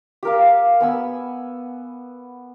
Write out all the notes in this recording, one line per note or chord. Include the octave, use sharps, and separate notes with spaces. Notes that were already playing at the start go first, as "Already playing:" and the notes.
G4 A#4 F5
B3 G#5 E6